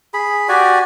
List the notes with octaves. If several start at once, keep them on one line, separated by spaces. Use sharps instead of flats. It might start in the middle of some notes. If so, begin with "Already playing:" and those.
G#4 B5
F#4 G4 D5 G#5